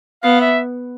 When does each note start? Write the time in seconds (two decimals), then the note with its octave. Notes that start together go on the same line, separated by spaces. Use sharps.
0.23 B3 F5
0.41 E5